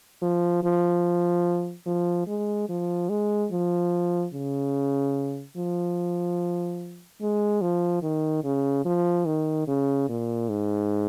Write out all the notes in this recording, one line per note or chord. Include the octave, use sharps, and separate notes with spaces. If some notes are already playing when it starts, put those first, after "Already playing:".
F3
F3
F3
G#3
F3
G#3
F3
C#3
F3
G#3
F3
D#3
C#3
F3
D#3
C#3
A#2
G#2